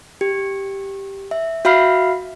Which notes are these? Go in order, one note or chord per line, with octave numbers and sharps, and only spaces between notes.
G4
E5
F#4 E5 F5 B5 F6 C7